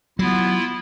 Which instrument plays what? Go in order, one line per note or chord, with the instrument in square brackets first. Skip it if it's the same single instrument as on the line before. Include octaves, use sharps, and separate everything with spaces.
[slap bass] F#3 [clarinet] B3 [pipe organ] E4 F4